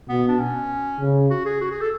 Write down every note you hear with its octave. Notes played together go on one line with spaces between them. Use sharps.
B2 B3
D4
C#4
C#3
F#4
G#4
F#4
G#4
A4